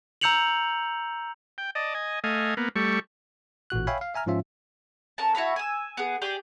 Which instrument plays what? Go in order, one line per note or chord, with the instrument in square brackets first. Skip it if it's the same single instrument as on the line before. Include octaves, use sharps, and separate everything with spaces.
[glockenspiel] A#5 E6 G6 C#7 F7 F#7
[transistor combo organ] G5
D5 D#5 A5
D#5 G#5
A3 D#5 F5 G#5
A#3 B3
G3 A3 C#6
[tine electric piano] A1 A#2 F#4 F#6
C#5 E5 F5 G5 G#5 B5
F5
E5 G#5 A#5 F6
G#2 F3 C#4 F4 E5
[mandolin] C#4 A#4 A5
E4 F#4 F5 B5
G#5 E6
B3 G#4
G4 G#4 D5 G5